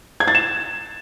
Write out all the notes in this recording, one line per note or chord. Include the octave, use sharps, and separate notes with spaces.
G#6
A6
E7